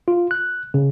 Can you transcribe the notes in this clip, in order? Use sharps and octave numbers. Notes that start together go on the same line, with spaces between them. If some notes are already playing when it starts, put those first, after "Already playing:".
F4
F#6
C#3